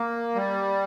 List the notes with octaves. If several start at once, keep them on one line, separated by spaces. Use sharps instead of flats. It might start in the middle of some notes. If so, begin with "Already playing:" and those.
Already playing: A#3
G3